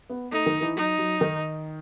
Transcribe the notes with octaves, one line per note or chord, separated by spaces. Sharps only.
B3
A3 D#4
D#3
E3
F#3 D#4
F#3
D#3